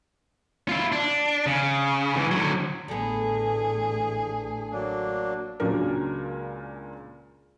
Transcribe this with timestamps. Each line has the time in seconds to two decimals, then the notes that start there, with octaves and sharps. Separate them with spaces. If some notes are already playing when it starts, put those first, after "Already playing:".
0.69 E4 F4
0.92 D4
1.46 C#3
2.16 C#2 E3
2.32 D3 F#3
2.88 A1 D3 B3 G#4
4.72 F#3 A#3 D4
5.60 C#2 A#2 C#3 F#3 D4 A#4